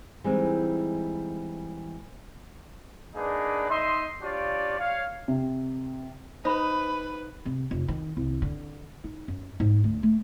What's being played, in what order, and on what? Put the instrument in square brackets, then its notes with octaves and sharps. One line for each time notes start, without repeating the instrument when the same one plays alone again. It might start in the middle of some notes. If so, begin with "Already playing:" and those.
[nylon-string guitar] E3 G3 G#3 C4 D#4
[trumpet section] A#3 D4 D#4 G#4 B4 D5
D#4 D#5 E5 C6
D4 F4 G4 C#5 D5
C#5 F5
[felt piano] C3
[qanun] D#4 [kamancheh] B4 [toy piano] C5 B5
[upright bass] C3
F1
D#3
C2
D3
D#4
F#2
G#2
D2
A3